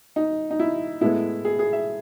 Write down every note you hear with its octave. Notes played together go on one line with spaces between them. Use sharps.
D#4
D#4
E4
A2 G#3 B3 E4
G#4
G#4
E5